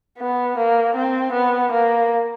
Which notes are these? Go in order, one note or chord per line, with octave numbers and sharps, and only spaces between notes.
B3
A#3
C4
B3
A#3